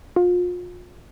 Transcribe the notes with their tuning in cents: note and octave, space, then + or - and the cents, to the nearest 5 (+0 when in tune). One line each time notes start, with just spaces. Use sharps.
F4 +35